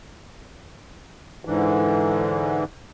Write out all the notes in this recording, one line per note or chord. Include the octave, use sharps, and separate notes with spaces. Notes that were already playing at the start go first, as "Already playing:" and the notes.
G#2 D3 E3